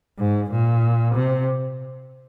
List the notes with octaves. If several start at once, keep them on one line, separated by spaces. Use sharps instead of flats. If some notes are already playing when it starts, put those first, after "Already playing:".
G#2
A#2
C3